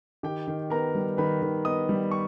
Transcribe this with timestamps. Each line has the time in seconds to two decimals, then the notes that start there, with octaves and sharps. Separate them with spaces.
0.23 D#3 G4 G5
0.48 D#3
0.70 B3 A#4 A#5
0.95 G3
1.17 D#3 B4 B5
1.42 D#3
1.65 B3 D#5 D#6
1.89 G3
2.11 C#6